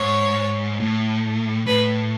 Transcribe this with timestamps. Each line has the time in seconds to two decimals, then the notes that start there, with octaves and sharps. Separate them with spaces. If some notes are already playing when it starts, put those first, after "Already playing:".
Already playing: G#2 C#5
0.80 A2
1.66 A2 B4